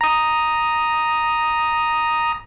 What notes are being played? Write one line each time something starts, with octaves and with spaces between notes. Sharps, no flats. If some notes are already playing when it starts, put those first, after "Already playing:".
A#5 D#6